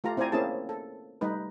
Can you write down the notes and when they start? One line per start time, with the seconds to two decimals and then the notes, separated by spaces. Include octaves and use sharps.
0.04 A3 F4 G4 A#5
0.17 C4 E4 C5 D5 G#5 A#5
0.32 A#3 C4 C#4 E4 G#4 A5
0.69 A4
1.21 G3 A3 D#4 B4